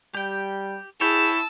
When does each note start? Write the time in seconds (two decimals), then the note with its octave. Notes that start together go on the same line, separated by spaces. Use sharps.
0.15 G3 G4 G5
1.01 E4 G#4 C#5 G5 A5 E6